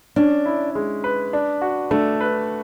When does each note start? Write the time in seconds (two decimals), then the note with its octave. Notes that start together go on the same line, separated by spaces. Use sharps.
0.16 C#4 D4
0.46 E4
0.75 G#3
1.04 B4
1.33 D4
1.61 F#4
1.91 A3 D4
2.21 B4